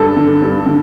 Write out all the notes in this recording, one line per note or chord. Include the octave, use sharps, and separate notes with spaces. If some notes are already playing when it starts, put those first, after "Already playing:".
Already playing: G2 A4
D3
G2
D3